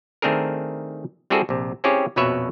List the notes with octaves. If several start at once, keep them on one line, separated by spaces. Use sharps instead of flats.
D#3 A3 C4 D4 G#4 A#4
G3 C4 E4 F#4 G#4 A4
A#1 C3
C4 C#4 E4 G4 G#4 C#5
A#1 F2 B2 B4 C#5 E5